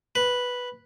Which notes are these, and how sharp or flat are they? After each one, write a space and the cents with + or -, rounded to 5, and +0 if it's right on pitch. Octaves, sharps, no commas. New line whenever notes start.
B4 -5